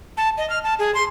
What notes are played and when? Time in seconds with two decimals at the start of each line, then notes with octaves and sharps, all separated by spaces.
0.17 A5
0.38 D#5
0.50 F6
0.64 A5
0.79 G#4
0.95 C6